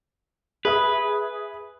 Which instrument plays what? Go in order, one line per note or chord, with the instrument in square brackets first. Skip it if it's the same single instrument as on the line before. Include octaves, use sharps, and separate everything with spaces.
[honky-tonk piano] G#4 E5 D#6 [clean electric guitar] B4